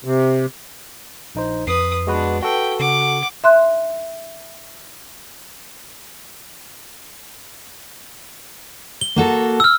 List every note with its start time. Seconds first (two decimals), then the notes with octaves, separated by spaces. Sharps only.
0.05 C3
1.35 A#1 D#4 C5
1.67 F2 B4 D#6 C7
2.07 G#3 B3 D4 F#4 B4
2.43 F#4 A4 B4 G5
2.80 C#3 F#5 D6
3.44 E5 C6 F#6
9.01 G7
9.16 A#3 F#4 A4
9.60 E6 F6